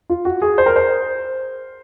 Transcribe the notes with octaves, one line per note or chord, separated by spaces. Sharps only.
F4
F#4
G#4
C5
A#4
C5